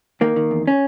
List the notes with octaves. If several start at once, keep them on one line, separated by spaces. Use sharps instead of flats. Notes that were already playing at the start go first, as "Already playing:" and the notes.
D#3 A#3
D#3
E2
C#4